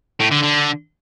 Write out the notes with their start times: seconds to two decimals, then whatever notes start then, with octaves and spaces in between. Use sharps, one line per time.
0.20 A2
0.32 D3
0.43 D3